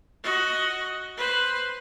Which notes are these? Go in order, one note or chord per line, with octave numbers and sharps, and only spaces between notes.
F#4 D#5
B4 C5